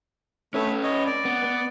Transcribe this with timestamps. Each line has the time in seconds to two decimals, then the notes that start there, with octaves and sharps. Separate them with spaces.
0.54 A3 C#4 B4 C#5 E5
0.83 C#5 D#5
1.06 D5
1.25 B3
1.44 B3